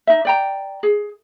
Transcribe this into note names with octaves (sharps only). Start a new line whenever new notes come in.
D#4 E5
D5 G5 A#5
G#4